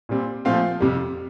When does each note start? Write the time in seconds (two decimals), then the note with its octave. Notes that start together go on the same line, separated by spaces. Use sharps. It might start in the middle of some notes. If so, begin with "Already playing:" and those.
0.09 A#2 G3 C4
0.45 A#2 F3 A3 C4 F5
0.80 F2 C3 G3